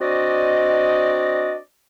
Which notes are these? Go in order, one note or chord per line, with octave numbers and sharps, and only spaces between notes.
C4 D4 F#4 D5 D#5